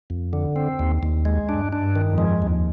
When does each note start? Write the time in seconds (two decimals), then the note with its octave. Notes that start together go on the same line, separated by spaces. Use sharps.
0.10 F2
0.33 D3
0.56 C4
0.79 D#2
1.03 D#2
1.25 G#3
1.49 G2 D4
1.72 D4
1.79 G2
1.95 D#3
2.10 F2
2.18 G#3
2.42 D#2